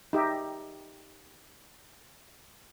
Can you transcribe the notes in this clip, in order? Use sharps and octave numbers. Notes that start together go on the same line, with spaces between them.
D#4 G4 E5